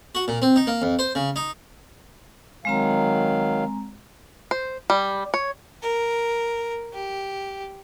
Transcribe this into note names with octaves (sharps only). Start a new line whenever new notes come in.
F#4
A#2
C4
D#4
A#3
F2
C5
C#3
D#4
D#3 F#3 G#3 C4 F5 A#5
C5
G3
C#5
A#4
G4